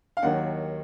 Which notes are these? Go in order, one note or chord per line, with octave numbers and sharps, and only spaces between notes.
F5
D#2 D#3 F#3 F#5